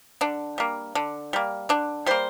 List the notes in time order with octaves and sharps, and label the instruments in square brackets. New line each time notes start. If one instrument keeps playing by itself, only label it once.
[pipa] D3 D4
G3 A#3
D3
G3 A#3
D3 D4
G3 A#3 C5